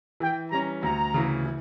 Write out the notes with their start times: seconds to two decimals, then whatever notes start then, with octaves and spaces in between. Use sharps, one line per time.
0.20 E3 G5
0.52 G3 C#4 A#5
0.83 D2 A#5
1.14 C#3 E3
1.46 E3